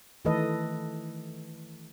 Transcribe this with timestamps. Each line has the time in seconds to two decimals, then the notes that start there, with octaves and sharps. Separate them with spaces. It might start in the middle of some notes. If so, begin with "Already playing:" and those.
0.25 D#3 E3 A3 A4 B4 D#5